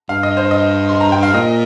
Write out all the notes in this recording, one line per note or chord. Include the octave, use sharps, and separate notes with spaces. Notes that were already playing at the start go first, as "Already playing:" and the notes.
G2 F5
D#5
C5
D#5
C6
A#5
G5
F5
A#2 D#5